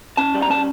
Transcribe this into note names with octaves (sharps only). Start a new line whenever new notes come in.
C#4 A5
G3
A#5
C#4 A5